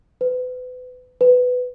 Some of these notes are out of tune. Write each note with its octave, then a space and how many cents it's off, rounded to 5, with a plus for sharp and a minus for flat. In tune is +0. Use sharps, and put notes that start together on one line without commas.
B4 +35
B4 +15